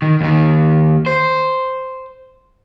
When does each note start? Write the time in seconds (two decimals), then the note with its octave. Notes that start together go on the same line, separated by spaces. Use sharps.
0.02 D#3
0.21 D#2 D#3
1.06 C5